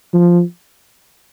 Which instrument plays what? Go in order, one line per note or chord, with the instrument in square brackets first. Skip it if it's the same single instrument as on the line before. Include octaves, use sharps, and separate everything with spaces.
[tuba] F3